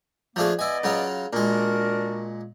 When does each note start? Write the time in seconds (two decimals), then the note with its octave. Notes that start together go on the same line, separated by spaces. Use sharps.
0.36 F3 A3 A#3 D4 G#4
0.59 B3 E4 D5 D#5 G#5
0.84 C#3 F#3 F4
1.33 A#2 G#3 D4 F#4 A#4